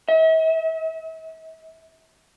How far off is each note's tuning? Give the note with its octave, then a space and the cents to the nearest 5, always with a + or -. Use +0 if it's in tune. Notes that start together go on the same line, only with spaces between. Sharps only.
E5 -45